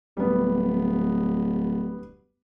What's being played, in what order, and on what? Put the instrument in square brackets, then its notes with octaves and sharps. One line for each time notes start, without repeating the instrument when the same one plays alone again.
[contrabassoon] D1 [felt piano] G3 B3